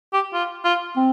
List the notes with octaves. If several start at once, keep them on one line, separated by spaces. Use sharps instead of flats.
G4
F4
F4
C4